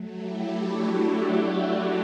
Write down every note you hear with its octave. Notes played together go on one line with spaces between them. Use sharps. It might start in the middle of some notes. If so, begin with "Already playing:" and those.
Already playing: F#3 A3
E4 G4
D4 F#4